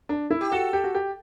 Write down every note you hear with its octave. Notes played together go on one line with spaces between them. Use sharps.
D4
E4
G4
F#4 A4
G4
F#4
G4